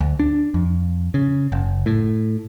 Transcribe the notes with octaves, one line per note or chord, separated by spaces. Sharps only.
D2
D4
F2
C#3
F#1
A2